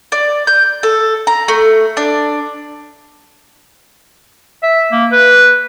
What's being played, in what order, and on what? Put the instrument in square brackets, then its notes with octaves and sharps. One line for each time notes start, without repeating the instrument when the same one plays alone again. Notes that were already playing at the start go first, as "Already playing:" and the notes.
[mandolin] D5
G6
A4
A#5
A3
D4
[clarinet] E5
A#3
B4